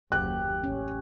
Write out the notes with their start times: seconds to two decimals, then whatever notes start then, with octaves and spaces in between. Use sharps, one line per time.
0.12 F#1 D#2 G4 F#6
0.64 A1 C#4